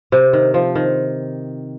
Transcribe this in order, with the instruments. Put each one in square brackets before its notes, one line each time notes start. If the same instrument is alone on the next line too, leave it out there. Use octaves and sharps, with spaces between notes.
[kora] C3
D#3
F3
D#3